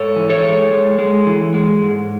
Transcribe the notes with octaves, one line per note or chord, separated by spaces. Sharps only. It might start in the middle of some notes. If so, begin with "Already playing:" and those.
Already playing: G#2 A4 C#5
E3
A4 C#5
G#3
G#3
G#3
E3
G#3
G#2